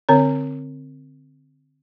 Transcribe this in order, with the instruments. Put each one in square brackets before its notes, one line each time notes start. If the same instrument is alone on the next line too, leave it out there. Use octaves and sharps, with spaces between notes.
[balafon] D3 C4 C#5